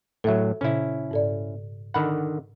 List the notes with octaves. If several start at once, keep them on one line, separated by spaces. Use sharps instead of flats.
A2 F#3 A4 E5
A#2 C#3 C#4 E4
G#2 A4 D5
D3 D#3 F#5 B5